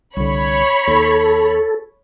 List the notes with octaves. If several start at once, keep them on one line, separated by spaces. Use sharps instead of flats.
C2 D3 C#5 B5
D#2 A4